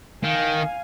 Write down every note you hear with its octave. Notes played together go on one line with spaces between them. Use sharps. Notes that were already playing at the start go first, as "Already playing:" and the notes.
D#3 F5 G#5